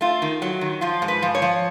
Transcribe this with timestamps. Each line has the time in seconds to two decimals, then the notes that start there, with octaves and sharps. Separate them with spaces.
0.01 A3 F4
0.22 D#3
0.42 F#3
0.61 D#3
0.81 F3 F4
1.02 G#2
1.08 B4
1.22 F3
1.35 C#5
1.42 F3